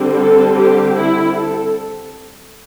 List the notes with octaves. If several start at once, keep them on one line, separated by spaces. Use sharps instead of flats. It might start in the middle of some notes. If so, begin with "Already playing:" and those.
Already playing: D3 G3 C4
A4
G4
E4
A4